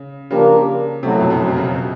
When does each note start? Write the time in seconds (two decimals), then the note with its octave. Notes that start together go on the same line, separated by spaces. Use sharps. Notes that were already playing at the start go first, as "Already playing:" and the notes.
Already playing: C#3
0.31 C#3 F3 A#3 D4 G4 A#4
1.03 A2 C3 F#3 A3
1.12 B2
1.21 F2
1.30 F#2
1.38 B2
1.48 C3
1.57 C#3
1.66 C3
1.74 B2